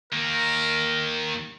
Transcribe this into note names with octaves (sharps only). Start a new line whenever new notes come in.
D#3 A#3 A#4